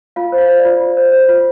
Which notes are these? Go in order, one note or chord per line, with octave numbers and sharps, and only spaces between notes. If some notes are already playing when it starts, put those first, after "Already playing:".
F4 F5
C5
F5
C5
D5
F4
F4
C5
C5
F4